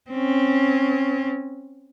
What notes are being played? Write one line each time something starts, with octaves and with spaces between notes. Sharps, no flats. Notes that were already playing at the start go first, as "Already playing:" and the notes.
C4 C#4